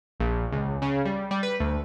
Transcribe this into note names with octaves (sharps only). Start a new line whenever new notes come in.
A#1
C#2
C#3
G3
G3
B4
D2